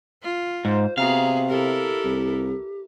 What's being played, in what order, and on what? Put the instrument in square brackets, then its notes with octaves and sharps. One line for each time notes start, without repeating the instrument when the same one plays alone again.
[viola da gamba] F4
[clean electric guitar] G#2 [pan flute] C5
[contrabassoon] C3 [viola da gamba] B3 F#4 G#4 [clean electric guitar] F5 [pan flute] A#5
[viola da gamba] E4 A4 A#4 [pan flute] G4
[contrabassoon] C2